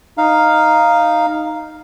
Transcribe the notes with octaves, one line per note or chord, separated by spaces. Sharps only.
D#4 F5